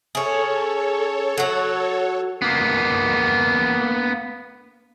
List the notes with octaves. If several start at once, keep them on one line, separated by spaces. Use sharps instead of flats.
C#4 G#4 A4 C#5
F#3 F#4
A#3 B3